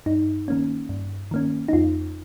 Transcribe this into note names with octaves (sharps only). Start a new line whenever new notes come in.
G2 D#4
D#3 A#3 C#4
G2
D#3 A#3 C#4
D#4
F2 F4